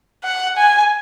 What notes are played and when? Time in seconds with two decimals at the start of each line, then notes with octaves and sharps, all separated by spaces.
0.24 F#5
0.57 G#5